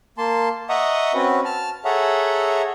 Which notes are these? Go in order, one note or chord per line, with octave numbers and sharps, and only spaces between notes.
A#3 A5 C6
D#5 E5 F#5 A#5 C#6 D#6
C4 C#4 F#4 B4
A5 F6
G#4 A4 C#5 E5 F#5 A#5